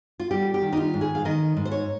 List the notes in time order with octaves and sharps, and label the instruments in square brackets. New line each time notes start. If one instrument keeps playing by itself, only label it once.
[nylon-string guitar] F4
G3 G4
G4
D#3
D#4
F4
G#2
G#4
F5
D#3 D#5
G#2
C5
C#5